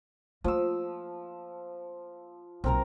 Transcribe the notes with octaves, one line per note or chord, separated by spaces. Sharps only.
F3 A3 A#3 E6
B1 A#2 C4 A#4 A#5